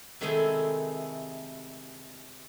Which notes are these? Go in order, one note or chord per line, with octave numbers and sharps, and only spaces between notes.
C3 D#3 G#3 A3 E4 G#4